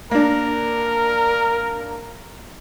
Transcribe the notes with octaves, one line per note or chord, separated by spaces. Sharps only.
A#3 D4 A#4